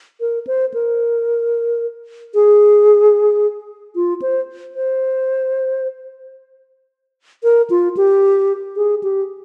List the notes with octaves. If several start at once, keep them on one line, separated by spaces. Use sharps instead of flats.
A#4
C5
A#4
G#4
F4
C5
C5
A#4
F4
G4
G#4
G4